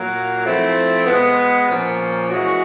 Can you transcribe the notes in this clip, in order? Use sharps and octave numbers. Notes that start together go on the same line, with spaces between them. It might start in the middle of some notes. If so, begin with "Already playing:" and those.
Already playing: A#2 F#3 A#3
F3 A3 C4 E4
B2 G#3 B3
A#2 F3 A#3 C#4
E3 G#3 C#4 F#4